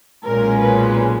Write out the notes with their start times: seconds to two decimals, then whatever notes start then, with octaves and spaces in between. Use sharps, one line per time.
0.25 B1 A#2 G#3 C#4 A#4
0.61 B4